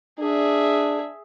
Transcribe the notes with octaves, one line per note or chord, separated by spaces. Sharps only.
D4 G#4 E5